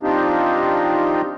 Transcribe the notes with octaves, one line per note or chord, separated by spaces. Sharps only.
F3 C4 D4 D#4 F4 G4